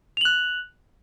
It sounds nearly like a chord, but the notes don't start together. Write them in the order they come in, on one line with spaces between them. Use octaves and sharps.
F7 F#7 F#6